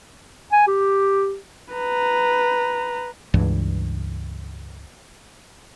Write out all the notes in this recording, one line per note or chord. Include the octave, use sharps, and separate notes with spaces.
G#5
G4
B4 A#5
C#2 G2 E3